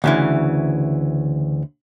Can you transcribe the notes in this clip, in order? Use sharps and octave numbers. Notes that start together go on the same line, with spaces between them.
D2 C#3 E3